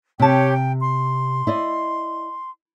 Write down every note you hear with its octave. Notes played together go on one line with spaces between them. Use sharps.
C3 G4 C#5 G5 A5
G5
C6
E4 D5 D#5